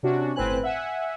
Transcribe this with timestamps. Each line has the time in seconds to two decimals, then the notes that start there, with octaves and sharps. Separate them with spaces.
0.03 C3 C#4 D4 F#4
0.36 G1 A2 C4 B4 G#5 F#6
0.63 E5 F#5 G#5